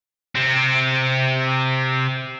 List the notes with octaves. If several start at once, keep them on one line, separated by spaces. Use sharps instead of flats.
C3 C4